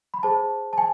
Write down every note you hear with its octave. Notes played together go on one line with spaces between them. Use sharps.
B5
G#4 C5 A5
A5
G#5